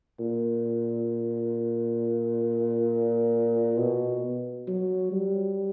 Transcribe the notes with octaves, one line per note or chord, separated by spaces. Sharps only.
A#2
B2
F#3
G3